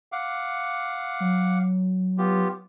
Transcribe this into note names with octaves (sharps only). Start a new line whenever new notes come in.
F5 F#5 D6
F#3
B3 F4 G4